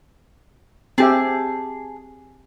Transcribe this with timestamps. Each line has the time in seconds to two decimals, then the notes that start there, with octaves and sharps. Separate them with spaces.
0.98 C4 G4 G#4 E5 A5